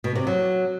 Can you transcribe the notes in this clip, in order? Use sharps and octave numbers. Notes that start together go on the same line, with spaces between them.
B2
C3
F#3